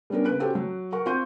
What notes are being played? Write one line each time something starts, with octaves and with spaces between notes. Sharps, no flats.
G3 B3 C#4 D4 A#4
C#3 A#3 B4 F#6 D7
C#4 F#4 G4 A4 C5 G5
F#3
A#4 F#5 C#6
C4 F4 C6 C#6 G6 D#7